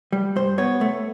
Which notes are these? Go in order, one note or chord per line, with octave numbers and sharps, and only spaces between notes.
G3
G2 C5
B3 C#5
A3